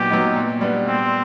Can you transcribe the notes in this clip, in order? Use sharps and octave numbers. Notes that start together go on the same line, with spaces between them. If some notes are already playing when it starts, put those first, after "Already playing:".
Already playing: A#2 F#3 B3 D#4 G4
F#3 B3 D#4
A#2
G3 B3 D4
A#2 C4